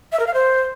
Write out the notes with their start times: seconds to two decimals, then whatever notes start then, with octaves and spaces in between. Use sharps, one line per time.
0.12 E5
0.20 A#4
0.27 F5
0.34 C5